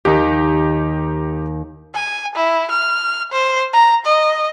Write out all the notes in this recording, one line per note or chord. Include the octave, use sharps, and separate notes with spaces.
D#2 D#4 G4
G#5
E4
F6
C5
A#5
D#5